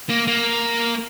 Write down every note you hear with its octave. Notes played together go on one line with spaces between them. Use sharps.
A#3
A#3